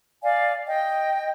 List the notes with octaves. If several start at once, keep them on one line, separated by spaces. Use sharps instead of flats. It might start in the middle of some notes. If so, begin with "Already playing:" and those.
D5 F5 G#5
D#5 G5